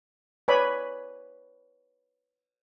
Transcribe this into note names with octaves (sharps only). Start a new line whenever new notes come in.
B4 C#5 D5 G#5 B5